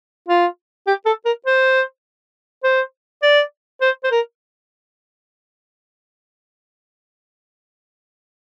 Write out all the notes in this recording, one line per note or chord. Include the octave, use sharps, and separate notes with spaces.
F4
G4
A4
A#4
C5
C5
D5
C5
C5
A#4